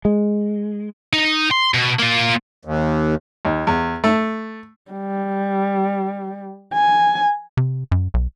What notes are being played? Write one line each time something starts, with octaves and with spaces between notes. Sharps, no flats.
G#3
D#4
C6
B2
A#3 F4
D#2
D#2
E2
A3
G3
G#5
C3
F#2
B1